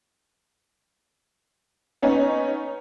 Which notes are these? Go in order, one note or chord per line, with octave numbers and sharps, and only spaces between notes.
B3 C#4 D#4 C#5